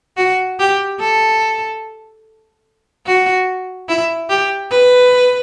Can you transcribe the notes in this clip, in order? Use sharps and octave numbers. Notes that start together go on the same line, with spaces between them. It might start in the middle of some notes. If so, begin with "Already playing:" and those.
F#4
G4
A4
F#4
E4
G4
B4